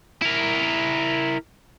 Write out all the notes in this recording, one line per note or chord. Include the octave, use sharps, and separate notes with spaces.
E4 A#4